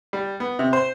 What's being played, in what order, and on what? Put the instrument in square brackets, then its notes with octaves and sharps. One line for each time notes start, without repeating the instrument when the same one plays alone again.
[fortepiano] G3
B3
C3
C5